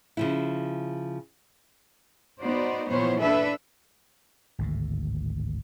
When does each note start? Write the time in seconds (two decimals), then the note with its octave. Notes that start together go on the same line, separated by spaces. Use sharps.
0.17 C#3 F3 E4
2.41 B3 D#4 F#4 C5 D5
2.90 A#2 E3 F3 B3 C5 C#5
3.20 D4 A4 B4 E5
4.59 G#1 D2 A2